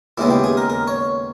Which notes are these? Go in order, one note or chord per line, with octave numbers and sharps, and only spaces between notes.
D#2 C#3 G#3 B3 E4
G4
G#4
A#4
A#4
C#5